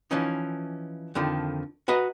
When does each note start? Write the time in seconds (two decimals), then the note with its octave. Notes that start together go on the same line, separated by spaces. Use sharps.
0.11 E3 F3 C#4 D#4
1.15 F2 D3 D#3 F3
1.88 F#4 B4 D#5 A#5